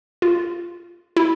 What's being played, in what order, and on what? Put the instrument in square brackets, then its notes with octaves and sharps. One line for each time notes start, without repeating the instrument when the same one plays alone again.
[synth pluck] F4
E4